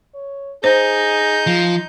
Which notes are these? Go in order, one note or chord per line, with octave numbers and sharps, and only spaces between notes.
C#5
D#4 G#4 C5 G6
F3